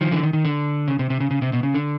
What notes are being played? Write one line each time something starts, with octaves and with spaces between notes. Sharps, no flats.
D#3 F3
D3 E3
D#3
D#3
D3
C#3
C3
C3
C#3
C#3
C3
B2
C#3
D3